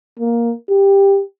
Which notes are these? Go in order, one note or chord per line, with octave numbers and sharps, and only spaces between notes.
A#3
G4